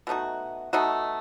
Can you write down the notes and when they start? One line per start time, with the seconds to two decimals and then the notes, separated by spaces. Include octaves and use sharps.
0.07 B2 A3 D#4 F#4
0.73 B2 A3 D#4 F#4